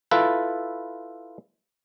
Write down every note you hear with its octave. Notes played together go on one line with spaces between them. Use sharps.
E4 F4 A4 B4